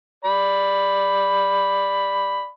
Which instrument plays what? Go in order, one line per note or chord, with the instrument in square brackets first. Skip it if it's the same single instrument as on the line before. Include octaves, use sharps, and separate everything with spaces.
[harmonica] D5 B5